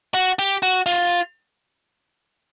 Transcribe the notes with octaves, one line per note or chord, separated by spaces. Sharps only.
F#4
G4
F#4
F4